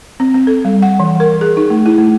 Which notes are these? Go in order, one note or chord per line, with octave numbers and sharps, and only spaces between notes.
C4
C4
A4
G3
F#5
E3
A#4
G#4
D#4
A3
E4
A3